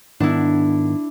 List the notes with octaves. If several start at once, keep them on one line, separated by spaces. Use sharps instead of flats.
G#2 D#3 B3 D4 E4